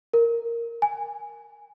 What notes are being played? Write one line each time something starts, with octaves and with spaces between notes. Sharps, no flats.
A#4
G#5